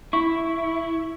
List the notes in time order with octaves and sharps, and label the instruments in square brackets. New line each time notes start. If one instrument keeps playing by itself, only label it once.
[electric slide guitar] E4 [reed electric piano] C#6